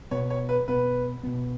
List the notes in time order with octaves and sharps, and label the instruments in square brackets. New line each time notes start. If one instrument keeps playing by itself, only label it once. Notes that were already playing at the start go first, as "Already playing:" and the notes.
[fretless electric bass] B2 B3 [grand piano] C#5
[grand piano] C#5
B4
[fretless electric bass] B2 B3 [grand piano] B4
[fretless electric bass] B2 B3